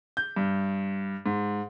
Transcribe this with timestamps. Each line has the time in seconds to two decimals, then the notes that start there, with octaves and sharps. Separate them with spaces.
0.17 G6
0.36 G2
1.26 G#2